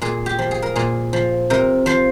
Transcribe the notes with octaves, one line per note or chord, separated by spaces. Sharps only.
A#2 G#4
G4
F3
G#4
A#4
A#2 G#4
F3
C3 A#4
F3 C5